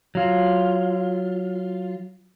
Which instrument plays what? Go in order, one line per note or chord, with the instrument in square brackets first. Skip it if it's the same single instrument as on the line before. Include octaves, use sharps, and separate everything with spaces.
[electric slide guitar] F#3 F4